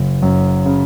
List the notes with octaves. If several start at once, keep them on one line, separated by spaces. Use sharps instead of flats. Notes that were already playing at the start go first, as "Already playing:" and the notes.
Already playing: F#1
F#2
C#3